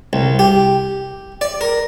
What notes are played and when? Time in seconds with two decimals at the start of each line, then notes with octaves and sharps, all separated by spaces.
0.13 C2
0.39 G4
1.41 D5
1.61 A#4